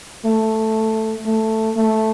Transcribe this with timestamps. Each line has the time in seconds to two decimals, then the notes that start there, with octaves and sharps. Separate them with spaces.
0.25 A3
1.26 A3
1.77 A3